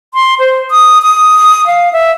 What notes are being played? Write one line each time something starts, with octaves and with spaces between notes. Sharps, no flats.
C6
C5
D#6
D#6
F5
E5